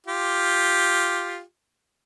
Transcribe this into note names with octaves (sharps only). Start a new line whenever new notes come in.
F4 G4